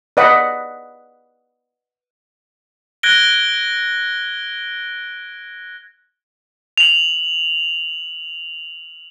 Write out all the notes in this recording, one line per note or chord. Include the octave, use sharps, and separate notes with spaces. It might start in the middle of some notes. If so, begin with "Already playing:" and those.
B4 D5 D#5 F#5 B5
F#6 G#6 A#6 D7 G7
F7 F#7